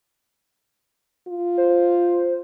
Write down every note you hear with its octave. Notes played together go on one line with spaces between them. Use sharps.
F4
C5